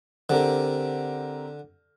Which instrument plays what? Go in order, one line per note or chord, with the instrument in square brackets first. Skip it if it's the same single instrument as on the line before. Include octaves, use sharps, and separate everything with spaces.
[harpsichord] D3 [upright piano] C4 G4 A#4